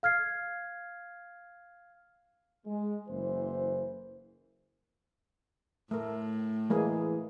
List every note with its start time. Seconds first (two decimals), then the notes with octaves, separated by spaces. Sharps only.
0.03 F5 F6 G#6 C7
2.66 G#3
3.08 F#1 E3 C5
5.91 A2 A3 A#4
6.70 E3 G#3 A#3 G#4